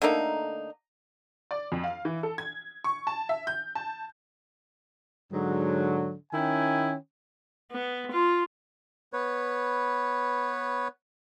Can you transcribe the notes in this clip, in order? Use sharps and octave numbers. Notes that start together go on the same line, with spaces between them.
D3 A3 A#3 D#4
D5
F2
F5
E3
A4
G#6
C#6
A5
E5
G6
A5
G#2 D3 F#3
D#3 C#4 E4 G5 G#5
B3
F4
B3 B4 C#5